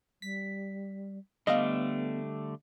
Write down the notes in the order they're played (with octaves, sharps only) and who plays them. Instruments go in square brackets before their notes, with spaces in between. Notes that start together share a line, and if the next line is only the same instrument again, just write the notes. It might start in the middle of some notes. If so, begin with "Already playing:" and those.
[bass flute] G3 [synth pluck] B6
[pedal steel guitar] D3 G3 A3 [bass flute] B3 [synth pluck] D#5 F5